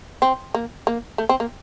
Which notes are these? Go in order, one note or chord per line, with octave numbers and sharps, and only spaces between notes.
C4
A#3
A#3
A3
C4
A#3